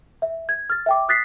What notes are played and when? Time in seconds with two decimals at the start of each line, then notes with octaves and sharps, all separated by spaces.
0.22 E5
0.49 G#6
0.70 F6 A6
0.86 E5 G5 D6
1.08 D#6 F#6 A6 B6 C7